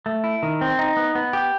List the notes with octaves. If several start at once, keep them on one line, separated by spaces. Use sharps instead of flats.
A3
E4
D#3
C4
D#4
B3
B3
G4